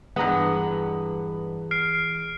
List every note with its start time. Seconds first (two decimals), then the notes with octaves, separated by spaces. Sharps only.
0.16 G2 E3 G#3 B3 F#5 A#5
1.71 F6 C7 D7